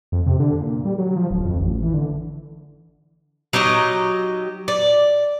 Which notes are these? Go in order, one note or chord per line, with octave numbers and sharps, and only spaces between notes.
F2
C3
D3
A#2
G3
F#3
F3
D1
F2
A1
E3
D3
F#3 D#4 G4 D#5
D5